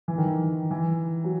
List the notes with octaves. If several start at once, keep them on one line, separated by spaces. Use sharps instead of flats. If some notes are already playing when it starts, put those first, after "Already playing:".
E3
D#3
E3
E3
F#3